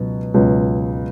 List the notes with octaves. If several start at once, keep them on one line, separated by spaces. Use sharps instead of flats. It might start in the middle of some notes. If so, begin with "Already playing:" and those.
Already playing: C#2 B2 F#3
C#2 B2 F#3